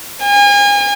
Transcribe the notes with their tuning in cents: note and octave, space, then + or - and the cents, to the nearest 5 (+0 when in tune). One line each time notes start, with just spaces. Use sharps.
G#5 -35